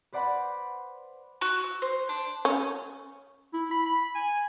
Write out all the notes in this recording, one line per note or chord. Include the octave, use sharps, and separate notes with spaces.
B4 C5 D5 F#5 B5 C6
F#4
E6
C5
D4
C#4
E4
B5
B5
G#5